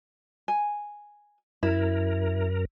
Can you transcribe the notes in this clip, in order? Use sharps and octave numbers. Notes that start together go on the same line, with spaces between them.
G#5
F#2 E4 A#4